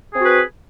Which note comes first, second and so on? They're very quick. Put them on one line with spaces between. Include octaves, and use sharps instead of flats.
G#4 C4 F#4 B4